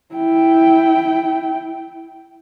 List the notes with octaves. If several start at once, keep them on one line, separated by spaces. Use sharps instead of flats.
E4 G5